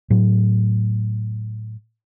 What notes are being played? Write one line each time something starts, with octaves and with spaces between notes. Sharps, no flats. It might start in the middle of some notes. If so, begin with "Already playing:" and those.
A2 F#3